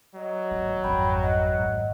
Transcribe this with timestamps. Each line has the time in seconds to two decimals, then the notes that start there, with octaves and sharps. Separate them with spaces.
0.15 F#3 D#5
0.51 G1
0.83 G#1 F2 G5 B5
1.23 D#5 F#5
1.56 G#2 D#3